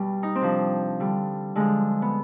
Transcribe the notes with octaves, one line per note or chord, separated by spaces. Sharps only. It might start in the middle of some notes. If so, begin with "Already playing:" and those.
Already playing: B2 G3
D#4
C4
C3 F3 D4
D3 G3
D3 F3 G#3
B3